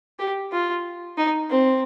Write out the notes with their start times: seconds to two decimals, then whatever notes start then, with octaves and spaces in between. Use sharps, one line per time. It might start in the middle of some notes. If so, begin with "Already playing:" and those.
0.19 G4
0.52 F4
1.18 D#4
1.50 C4